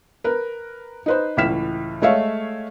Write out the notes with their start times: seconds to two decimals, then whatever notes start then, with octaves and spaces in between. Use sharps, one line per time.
0.24 A#4 B4
1.06 D#4 B4 C5
1.37 C#2 A2 E3 F6 B6 E7
2.02 G#3 A3 C#5 E5 F5